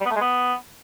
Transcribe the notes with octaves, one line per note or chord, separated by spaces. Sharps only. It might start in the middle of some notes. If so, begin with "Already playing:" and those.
G3
B3
A3
G#3
B3